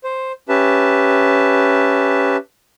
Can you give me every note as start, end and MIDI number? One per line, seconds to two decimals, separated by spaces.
0.04 0.32 72
0.49 2.36 61
0.49 2.36 67
0.49 2.36 71
0.49 2.36 76
0.49 2.36 81